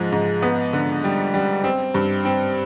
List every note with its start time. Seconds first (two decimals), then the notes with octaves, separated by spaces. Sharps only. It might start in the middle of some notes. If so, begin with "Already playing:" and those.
Already playing: G#2 F3 G#3
0.12 G#2
0.42 B3
0.73 D3
1.04 G3
1.34 G3
1.64 C4
1.94 G2
2.25 C4